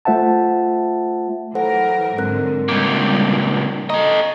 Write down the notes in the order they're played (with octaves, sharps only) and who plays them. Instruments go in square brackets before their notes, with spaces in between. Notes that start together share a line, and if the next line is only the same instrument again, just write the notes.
[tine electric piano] A3 F4 C5 E5 F#5 A5
[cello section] E3 F#3 A#4 [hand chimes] A4 C5 F#5
[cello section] G#2 D3 F#3 [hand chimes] C4 A#4 F#6
[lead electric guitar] C#2 A#2 [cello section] G3 D4
[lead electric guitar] A4 D#5 [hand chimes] A#5 C#6